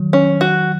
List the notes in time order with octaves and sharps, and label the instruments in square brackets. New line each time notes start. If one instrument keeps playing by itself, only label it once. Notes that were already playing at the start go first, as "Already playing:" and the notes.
Already playing: [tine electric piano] D#3 F#3
[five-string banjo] C#4
F#4